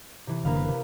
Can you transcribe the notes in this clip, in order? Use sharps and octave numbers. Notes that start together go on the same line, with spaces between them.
C3 E3
F#1 D3 E3 A#3 B4 F5
B4
C3